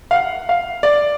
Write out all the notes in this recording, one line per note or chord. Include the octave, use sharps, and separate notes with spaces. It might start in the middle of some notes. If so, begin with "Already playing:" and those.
F5
F#5
F5
D5